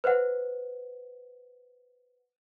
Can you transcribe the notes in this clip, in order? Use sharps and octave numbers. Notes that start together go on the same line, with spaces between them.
B4 C5 E5 F#5